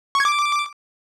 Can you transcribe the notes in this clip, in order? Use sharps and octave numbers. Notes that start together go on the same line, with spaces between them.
C#6
G#6
D6